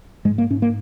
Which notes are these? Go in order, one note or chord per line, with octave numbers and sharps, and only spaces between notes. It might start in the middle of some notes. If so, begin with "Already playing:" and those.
G#2 G#3
A#3
G#2 C#4
A#3